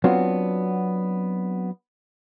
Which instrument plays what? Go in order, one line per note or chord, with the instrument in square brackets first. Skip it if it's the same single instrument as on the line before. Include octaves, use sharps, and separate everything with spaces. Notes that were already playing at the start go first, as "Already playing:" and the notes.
[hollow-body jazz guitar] F#3 B3 C4 D4 F4 F#4